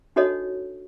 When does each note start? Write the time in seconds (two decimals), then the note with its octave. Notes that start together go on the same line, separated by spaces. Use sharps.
0.16 D4 D#4 F#4 A4 C#5 D#5